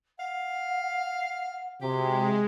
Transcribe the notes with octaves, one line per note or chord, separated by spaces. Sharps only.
F5 F#5
C3 G#3 F#4 G4